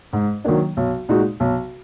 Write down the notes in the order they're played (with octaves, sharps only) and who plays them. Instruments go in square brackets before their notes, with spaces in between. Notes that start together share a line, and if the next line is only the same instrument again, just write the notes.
[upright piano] G#2
D#3 F#3 A#3 D4
B1
A#2 G#3 D#4 F#4
B1